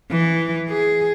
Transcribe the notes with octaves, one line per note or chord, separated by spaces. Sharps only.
E3
G#4